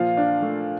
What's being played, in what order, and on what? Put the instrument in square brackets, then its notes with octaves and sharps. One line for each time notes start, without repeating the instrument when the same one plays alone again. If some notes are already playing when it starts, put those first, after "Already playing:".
Already playing: [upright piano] A#2 F3 [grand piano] F5
[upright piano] D4
A3